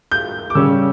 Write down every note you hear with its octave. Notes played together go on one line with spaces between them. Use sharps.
G6
D6
C#3 G3 C#4 E6